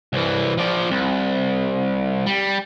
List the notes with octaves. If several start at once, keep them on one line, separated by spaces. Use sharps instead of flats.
C2 E3
F3 D5
C2
G3